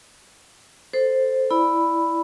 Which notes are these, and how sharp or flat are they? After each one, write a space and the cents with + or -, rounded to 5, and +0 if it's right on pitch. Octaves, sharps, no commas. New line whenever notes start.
A4 +0 C5 +0
E4 +5 D5 +0 B5 +0